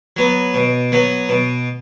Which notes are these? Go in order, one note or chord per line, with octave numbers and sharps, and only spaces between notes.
F#3 B3
B2
F#3 B3
B2